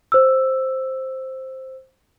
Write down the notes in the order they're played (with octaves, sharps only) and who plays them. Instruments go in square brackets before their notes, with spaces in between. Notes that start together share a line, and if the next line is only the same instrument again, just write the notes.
[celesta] C5 E6